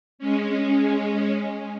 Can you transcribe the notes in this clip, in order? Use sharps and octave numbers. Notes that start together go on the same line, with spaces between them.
G#3 C#4